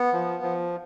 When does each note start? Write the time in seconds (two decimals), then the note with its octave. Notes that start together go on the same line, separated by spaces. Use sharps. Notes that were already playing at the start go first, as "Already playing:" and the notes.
Already playing: B3
0.13 F3
0.43 F3